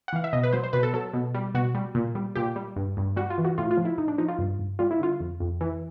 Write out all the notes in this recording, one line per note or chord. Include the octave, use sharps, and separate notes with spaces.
F#5
E3 F5
E5
B2 D#5
B4
F#3 C5
C5
B2 B4
A4
F#3 A4
B2
G3
B2 F#4
G3
A#2
G3
A#2 G4
G3
G2
G2
G3 F#4
F4
E3
F#4
A2 F4
F4
F3
E4
A2 D#4
D4
F3 D#4
F4
G2
G2
G3 F4
E4
D3 F4
F2
F2
E3